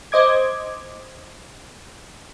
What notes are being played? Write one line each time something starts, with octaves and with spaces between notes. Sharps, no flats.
C5 D#5 D6 G#6